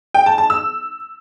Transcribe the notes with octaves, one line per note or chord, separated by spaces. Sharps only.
G5
A5
A5
E6